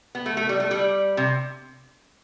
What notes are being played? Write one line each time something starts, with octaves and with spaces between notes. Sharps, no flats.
B3
A3
A3
G3
A3
G3
C3